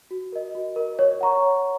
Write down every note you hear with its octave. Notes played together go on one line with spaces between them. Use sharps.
F#4
A#4 D#5
F#4
A#4 D#5
C#5
F#5 A#5 C#6
C#5